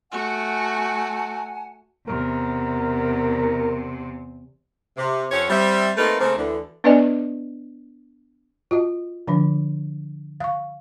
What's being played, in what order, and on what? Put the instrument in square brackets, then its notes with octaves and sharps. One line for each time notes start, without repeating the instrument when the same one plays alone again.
[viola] A3 F#4 [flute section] F#5 G#5 A5
[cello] E2 C3 [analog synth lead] A#4
[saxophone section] C3
F2 C4 C#4 C#5
G3 C4 E5
A3 A#3 C4 D#4 A#4 B4
C#3 A3 A#3 C4
D2 D3 E3
[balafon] B3 D4 B4 D5 D#5 G#5
F4 F#4 D#5
D3 F3 D4
F5 C#6